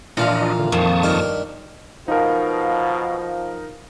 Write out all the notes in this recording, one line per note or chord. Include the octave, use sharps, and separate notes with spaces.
A#2 E3 F3 D4 F4 D#5 F5
D3
F2 D#3 A5 C#6 D#6
G2 D#4 A#4
B2 F3 D#4 A#4 F5